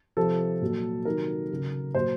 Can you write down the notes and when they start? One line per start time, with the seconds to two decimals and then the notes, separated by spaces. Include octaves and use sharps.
0.17 C3 F3 A4
0.62 A#2 F#3
1.05 C3 D#3 F#3 A#4
1.51 C#3 F#3
1.95 A#2 F#3 C5